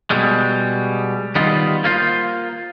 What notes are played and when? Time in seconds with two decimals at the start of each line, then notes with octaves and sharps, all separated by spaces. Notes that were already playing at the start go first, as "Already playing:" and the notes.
0.10 B2 G3 G#3
1.35 D#3 G3 B3 D#4 F4
1.84 A#3 F4 C5